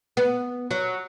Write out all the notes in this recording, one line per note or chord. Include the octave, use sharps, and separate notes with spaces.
B3
F#3